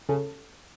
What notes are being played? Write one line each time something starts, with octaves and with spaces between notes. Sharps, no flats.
C#3 A4